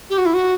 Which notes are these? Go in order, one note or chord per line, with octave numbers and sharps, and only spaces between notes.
G4
F#4
E4
F#4